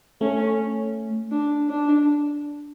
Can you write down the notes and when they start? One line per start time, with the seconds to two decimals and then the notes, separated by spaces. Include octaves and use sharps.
0.21 A3 C#4
1.31 D4
1.69 D4